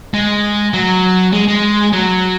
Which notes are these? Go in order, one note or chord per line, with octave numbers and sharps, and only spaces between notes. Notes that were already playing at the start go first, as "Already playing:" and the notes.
G#3
F#3
G#3
G#3
F#3